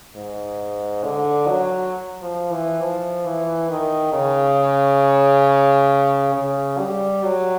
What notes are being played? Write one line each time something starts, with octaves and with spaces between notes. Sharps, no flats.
G#2
D3
F#3
F3
E3
F3
E3
D#3
C#3
C#3
G3
F#3